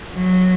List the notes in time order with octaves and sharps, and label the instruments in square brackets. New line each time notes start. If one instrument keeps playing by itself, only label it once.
[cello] F#3